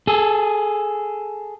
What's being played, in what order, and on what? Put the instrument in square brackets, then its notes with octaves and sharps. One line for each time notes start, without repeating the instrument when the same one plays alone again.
[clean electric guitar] G#4 A4